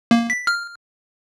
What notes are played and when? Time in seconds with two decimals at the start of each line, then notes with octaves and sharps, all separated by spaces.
0.11 A#3
0.30 B6
0.47 F6